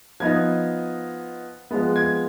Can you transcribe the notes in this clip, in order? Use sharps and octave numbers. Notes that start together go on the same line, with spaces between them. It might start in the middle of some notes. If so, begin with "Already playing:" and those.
F3 B3 D#4 G#6
F3 G#3 B3
G#6